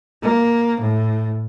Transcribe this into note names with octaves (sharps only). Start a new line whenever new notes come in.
A#3
A2